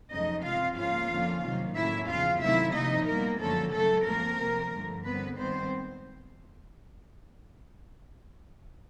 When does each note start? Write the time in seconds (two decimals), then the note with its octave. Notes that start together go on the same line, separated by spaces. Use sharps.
0.11 F2 C#3 F#3 A3 D#4 D#5
0.44 C3 E3 G#3 C4 F4 F5
0.77 G#2 F3 A#3 C#4 F4 F5
1.10 F2 D3 F3 A#3 C#4
1.43 C3 D#3 F#3 A#3
1.75 A2 F#3 A#3 C#4 E4 E5
2.08 E2 C#3 F3 F4 F5
2.42 C3 D#3 F#3 A3 E4 E5
2.74 C3 F3 A#3 D#4 D#5
3.07 A#2 G3 A#3 B3 A#4
3.41 F#2 D3 F3 A3 A#3 C#4 A4
3.73 F#2 C#3 F#3 A3 A4
4.06 A#2 F3 A3 A#3 C4 A#4
4.40 C3 F3 A#3
4.73 G2 D3 F3 A3
5.05 D3 G3 B3 C4 B4
5.38 G#2 D#3 G3 B3 C4 C5